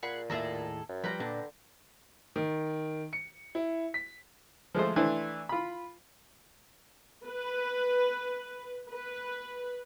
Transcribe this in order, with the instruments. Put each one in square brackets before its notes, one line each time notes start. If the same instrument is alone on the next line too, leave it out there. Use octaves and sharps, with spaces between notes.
[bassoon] A#2 [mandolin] G#4 F#5 B5
[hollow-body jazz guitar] D#2 A2 E5 [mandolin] G#4 A4 A#5
[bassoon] F#2
[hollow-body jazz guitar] F3 G3 [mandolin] B4 G5 A#5
[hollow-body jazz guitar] A#2 D4 [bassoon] D3
[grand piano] D#3
C#7
E4
B6
[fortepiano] F3 G#3 A3 C5
E3 A3 D4 C5
F4 B5
[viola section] B4
B4